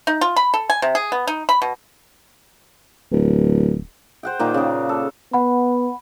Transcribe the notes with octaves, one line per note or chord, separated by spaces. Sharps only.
D#4
F4
B5
A4
G#5
C3
G#4
B3
D#4
B5
B2
D1
C5 F#5 G5
A#2 D#3 A#3
C#3 G#4
A4
B3 F#5 B5